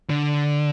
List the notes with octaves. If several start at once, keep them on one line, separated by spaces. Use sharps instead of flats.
D3